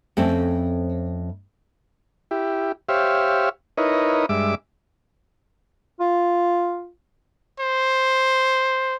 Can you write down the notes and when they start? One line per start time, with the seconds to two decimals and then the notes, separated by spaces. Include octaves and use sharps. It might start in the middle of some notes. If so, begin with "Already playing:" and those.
0.17 F2 A3 C4 C#4
2.31 E4 G4
2.89 G4 C5 C#5 E5 F5
3.78 D#4 E4 A#4 B4 C#5 D#5
4.29 G2 G#3 E5 D6
6.00 F4
7.60 C5